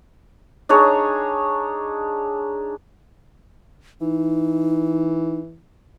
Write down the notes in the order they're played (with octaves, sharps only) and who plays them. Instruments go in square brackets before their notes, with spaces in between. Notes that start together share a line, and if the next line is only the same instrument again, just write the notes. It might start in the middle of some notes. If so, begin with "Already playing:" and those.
[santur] D4 D#4 G#4 C#5
[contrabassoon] E3 [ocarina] D#4